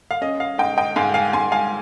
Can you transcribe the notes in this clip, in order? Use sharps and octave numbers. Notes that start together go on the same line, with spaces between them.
F5
C#4 D#5
F5
G#2 D#5 G5
D#5 G5
G#2 F5 G#5
F5 G#5
G#2 G#5 C6
F5 G#5